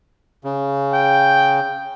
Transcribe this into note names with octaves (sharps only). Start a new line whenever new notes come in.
C#3
G5